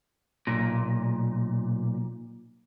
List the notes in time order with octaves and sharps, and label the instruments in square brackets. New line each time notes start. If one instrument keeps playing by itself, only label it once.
[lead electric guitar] B1 A#2